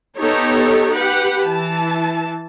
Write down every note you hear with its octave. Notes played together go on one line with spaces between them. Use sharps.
B3 D#4 G4 A4 C#5
G4 B4 F#5
E3 A5